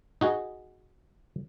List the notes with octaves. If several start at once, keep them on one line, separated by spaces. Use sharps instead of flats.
D#4 F#4 G#4